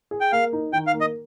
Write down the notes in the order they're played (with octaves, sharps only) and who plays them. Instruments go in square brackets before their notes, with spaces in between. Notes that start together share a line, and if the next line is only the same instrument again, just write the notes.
[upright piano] G#4
[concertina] G5
[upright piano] A#3 [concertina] F5
[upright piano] D#4
[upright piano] D#3 [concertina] G5
[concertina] F5
[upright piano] A#3
[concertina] D#5